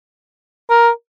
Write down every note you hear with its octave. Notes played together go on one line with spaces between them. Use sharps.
A#4